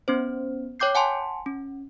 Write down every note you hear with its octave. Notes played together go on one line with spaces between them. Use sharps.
B3 C#4 C5
C#5 G5 D6 G6 C7
F#5 G#5 A5 C6
C#4